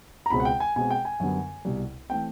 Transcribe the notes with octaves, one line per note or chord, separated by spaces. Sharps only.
A#5
C#2 B2 G#3 C4 B5
F#5
G5
G#5
B2 G#3 C4 G#5
G5
G#5
F#2 D3 G3 B3
C2 B2 G3
E3 A3 C4 G5